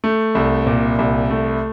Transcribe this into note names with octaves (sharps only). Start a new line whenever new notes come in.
A3
C2
A#2
C2
A3